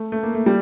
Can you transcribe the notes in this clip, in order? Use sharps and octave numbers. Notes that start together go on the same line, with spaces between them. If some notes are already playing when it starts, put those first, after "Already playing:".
Already playing: A3
A3
A#3
A3
G3